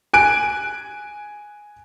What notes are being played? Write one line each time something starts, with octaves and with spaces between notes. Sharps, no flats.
G#5 F#6 D7